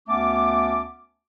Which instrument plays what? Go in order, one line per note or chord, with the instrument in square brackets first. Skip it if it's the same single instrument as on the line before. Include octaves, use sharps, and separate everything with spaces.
[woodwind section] D2 A3 B3 C#4 A5 D6